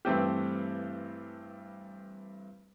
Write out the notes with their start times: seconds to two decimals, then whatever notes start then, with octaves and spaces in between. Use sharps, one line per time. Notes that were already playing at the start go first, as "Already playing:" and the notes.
0.05 G2 E3 A3 C4 G4